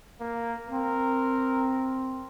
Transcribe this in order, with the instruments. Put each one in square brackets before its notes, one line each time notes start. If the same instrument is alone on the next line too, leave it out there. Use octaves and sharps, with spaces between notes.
[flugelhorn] A#3
[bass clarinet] C4 [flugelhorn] A#4